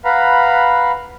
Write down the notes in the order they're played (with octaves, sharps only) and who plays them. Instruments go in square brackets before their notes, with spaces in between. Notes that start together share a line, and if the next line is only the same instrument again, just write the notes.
[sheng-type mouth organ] B4 F5 F#5 A#5 B5